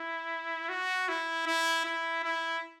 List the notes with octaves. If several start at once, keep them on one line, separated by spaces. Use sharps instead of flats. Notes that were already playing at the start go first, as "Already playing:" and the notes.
Already playing: E4
F#4
E4
E4
E4
E4